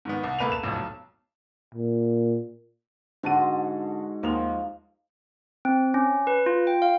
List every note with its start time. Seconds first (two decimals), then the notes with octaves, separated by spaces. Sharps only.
0.05 G#2 D#3 B3
0.24 C2
0.39 D#1 A3 A#3 B4 D#7 F7
0.52 E7
0.63 E1 B1 F2 A2
0.76 B1
1.75 A#2
3.23 G#2 D3 F#4 A5 C6 D#7
4.23 D#2 F3 A#4 D#5 F7
5.65 C4
5.94 C#4
6.27 B4
6.46 F4
6.67 G5
6.82 F5